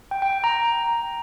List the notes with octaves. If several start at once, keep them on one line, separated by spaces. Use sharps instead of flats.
G5
G5
G5
A#5